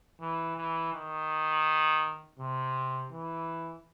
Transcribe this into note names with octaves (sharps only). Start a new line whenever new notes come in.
E3
E3
D#3
C3
E3